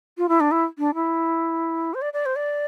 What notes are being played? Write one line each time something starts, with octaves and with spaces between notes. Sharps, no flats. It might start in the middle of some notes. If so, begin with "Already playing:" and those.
F4
E4
D4
E4
D4
E4
C5
D5
D5
C5
D5